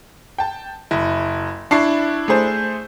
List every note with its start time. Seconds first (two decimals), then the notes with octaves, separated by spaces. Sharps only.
0.38 G5 A5
0.91 F#1 E4
1.71 D4 E4 A5 C#6 C7
2.28 A3 G#4 C5